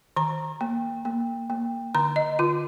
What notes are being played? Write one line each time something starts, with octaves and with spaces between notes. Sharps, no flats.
D#3 A#5
A#3
A#3
A#3
D3 A#5
D#5
D3 F4